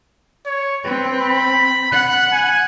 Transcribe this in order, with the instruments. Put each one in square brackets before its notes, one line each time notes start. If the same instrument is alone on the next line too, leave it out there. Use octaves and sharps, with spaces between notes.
[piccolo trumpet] C#5
[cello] C4 [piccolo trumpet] B4
[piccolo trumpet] B5
[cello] F#5 [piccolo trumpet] F#6
[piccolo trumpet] G#5